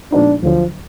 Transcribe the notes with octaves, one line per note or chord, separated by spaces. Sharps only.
A#2 F3 G#3 B3 D4 D#4
D2 D3 F3 F#3